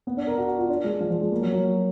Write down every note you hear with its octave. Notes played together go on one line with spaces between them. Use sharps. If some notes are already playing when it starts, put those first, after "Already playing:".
B3
D4
A#4
F#4
F#4
F4
D4
G#3
F3
F3
G#3
A#3
F#3
F#3